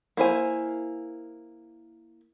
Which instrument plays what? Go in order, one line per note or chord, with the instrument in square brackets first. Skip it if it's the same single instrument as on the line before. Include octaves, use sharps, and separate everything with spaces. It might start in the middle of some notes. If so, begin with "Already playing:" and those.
[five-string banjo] A#3 E4 C5 G#5